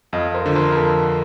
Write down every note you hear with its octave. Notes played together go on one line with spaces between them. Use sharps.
F2 D#5 F5
A#4 C5
D3 F3
A#4 C5
A#4
F2 A4 B4